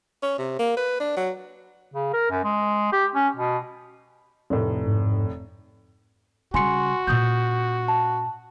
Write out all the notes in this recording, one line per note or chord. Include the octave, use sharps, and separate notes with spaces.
C#4
C3
A#3
B4
D4
F#3
C#3
A#4
F#2
G#3
G4
C#4
B2
F1 A2
G#2
C#3 G3 F#4 G#5 C6 C#7
A#2 C#4 D#6 G6
A5